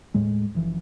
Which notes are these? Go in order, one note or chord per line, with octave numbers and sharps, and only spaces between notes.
D#2 A2 G#3
F#1 E3 F3